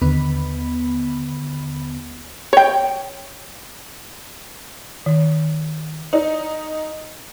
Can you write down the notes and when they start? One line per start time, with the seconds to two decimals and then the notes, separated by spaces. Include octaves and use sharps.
0.01 D#2 D3 B3 B5
2.53 C#5 G5
5.06 D#3
6.13 D#4